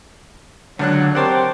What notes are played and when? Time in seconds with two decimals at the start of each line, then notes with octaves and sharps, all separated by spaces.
0.79 C#2 D3 F#3 D4 F#6
1.15 C4 G4 A#4 C5 C#5 F#5 G5 A5